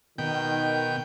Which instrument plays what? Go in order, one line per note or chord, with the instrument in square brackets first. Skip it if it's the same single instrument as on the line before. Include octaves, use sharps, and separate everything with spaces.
[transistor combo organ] B2 G5 [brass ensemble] D#3